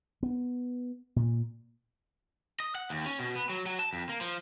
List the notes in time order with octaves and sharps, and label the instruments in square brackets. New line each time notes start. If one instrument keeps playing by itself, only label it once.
[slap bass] B3
A#2
[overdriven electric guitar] D#5
F#5
D#2
C#4
B2
B3
F#3
F#3
A5
F2
A#3
F3